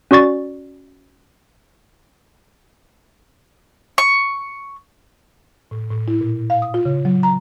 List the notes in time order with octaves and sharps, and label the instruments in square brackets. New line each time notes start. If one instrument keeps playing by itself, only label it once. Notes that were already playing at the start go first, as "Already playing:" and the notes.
[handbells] C#4 F#4 D5 C#6 A6
[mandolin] C#6
[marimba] A2
A2
E4
A#2
F5
D#6
F4
C#3
F#3
A#5